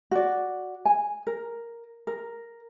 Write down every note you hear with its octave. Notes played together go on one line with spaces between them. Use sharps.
F#4 D5
G#5
A#4
A#4